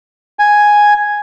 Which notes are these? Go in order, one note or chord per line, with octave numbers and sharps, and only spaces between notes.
G#5